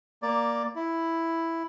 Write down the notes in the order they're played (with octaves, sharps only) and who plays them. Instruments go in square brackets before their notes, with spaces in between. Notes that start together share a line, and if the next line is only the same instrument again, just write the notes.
[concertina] A#3 D5
E4